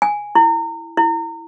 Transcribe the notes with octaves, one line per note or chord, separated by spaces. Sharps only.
G#5
E4
E4